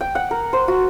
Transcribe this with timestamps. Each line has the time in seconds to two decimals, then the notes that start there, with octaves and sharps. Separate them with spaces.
0.01 G5
0.15 F#5
0.31 A#4
0.53 C5
0.68 F#4